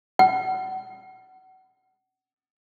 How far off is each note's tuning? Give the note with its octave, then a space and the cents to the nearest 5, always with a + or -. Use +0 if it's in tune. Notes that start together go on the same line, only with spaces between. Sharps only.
F#5 +25